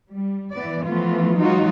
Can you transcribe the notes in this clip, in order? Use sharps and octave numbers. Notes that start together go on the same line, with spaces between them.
G3
E3 B3 D5
E3 F3 A3 B3 F4
E3 F#3 G#3 D#4 F4 F#4